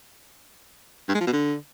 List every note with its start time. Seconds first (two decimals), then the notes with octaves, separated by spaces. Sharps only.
1.08 G2
1.14 G#3
1.20 F3
1.27 B2
1.33 D3